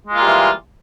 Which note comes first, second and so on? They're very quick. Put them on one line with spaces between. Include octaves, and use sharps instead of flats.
G#3 F4 A#3 G3 E3